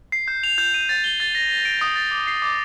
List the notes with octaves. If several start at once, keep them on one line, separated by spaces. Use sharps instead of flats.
C7
G6
F7
G6
D#7
A6
G7
A6
A#6
G7
D7
D#6
A6
D6
C7
D6